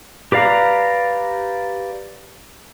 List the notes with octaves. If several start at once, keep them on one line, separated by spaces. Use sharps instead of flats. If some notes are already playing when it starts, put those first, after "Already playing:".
G4 B4 D5 F5 A#5